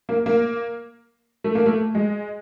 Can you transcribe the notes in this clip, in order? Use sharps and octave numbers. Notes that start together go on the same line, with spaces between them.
A#3
A#3
A3
A#3
A3
G#3